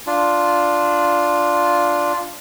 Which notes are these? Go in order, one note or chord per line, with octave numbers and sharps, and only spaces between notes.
D4 F4